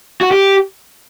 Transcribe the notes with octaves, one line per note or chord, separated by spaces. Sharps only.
F#4
G4